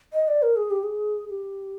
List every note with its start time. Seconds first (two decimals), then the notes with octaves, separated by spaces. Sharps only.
0.13 D#5
0.28 D5
0.42 A#4
0.56 G#4
0.71 G4
0.83 G#4
1.30 G4